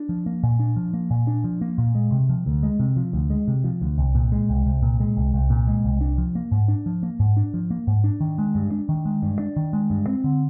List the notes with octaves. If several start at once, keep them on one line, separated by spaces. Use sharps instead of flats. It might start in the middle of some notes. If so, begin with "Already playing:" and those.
Already playing: D4
F3
A#3
A#2
D4
F3
A#3
A#2
D4
F3
A#3
A#2
G#3
C3
F3
D2
G#3
C3
F3
D2
G#3
C3
F3
D2
C2
A#2
G#3
C2
C2
A#2
G#3
C2
C2
A#2
G#3
C2
D4
F3
A#3
G#2
D4
F3
A#3
G#2
D4
F3
A#3
G#2
D4
D#3
G#3
G2
D4
D#3
G#3
G2
D4
D#3
G#3
G2
C4
D3